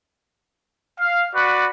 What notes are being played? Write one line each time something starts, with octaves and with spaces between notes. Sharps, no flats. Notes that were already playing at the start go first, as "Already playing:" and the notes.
F5
F#4 B4 D5